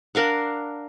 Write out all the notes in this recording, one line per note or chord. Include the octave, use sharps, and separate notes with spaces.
D4 A#4 F5 F#5